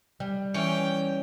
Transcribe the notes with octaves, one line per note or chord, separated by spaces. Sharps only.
G3
E3 C#4 G5